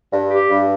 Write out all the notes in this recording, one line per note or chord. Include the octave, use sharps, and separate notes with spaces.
G2
G4
G2